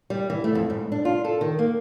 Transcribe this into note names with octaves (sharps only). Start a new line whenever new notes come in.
G3
E3
A3
F2
G#2
D4
F4
A4
D#3
A#3